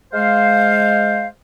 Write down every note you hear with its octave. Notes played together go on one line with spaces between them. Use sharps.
G#3 C5 F5